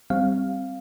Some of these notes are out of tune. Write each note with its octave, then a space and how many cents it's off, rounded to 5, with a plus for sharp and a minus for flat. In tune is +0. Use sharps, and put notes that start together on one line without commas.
G3 +0 C4 +0 F5 +0